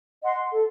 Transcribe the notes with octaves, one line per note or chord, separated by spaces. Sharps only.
D#5 F#5 C6
A4